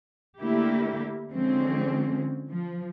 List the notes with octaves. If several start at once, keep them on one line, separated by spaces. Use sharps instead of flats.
D3 A3 A#3 E4 G4
D3 F3 G#3 C4 C#4
F3